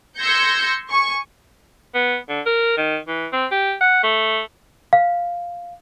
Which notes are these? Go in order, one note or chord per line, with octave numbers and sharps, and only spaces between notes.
C6 E6 G6 G#6 A#6 C#7
G#5 C#6
B3
D3
A#4
D#3
E3
C4
G4
F#5
A3
F5